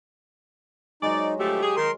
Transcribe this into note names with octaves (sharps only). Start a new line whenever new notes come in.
F#3 G#3 D#4 D5
D2 F3 A3 G4
G#4
D#3 A#4 C6